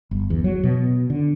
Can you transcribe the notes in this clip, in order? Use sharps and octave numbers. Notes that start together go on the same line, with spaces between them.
G1
E2
F#3
B2
D3